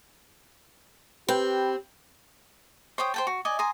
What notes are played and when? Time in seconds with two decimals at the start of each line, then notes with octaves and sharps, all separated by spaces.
1.29 C4 G4 B4 G5
2.98 C5 C#5 G5 D#6
3.14 C5 G5 A5
3.27 F#4
3.45 D5 D#5 G#5
3.59 G#5 A#5 C6 D#6